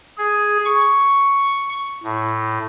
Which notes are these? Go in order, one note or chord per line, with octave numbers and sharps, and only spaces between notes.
G#4
C#6
A2